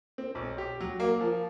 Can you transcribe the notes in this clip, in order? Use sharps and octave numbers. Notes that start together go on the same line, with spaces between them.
C4
B1
G4
F#3
A#3
F3